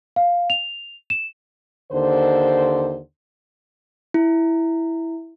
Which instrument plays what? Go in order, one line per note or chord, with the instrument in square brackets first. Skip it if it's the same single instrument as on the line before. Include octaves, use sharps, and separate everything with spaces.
[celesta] F5
F7
E7
[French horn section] D#2 D3 C5
[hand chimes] E4